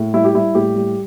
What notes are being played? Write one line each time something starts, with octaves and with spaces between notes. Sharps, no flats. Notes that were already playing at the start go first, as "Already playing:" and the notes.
Already playing: A2
G3 E4
G4
G3 E4
A2 G4
G3